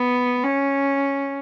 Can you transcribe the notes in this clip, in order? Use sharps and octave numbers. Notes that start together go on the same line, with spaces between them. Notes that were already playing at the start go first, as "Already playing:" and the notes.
Already playing: B3
C#4